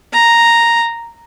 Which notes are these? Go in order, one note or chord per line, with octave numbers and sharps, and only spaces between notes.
A#5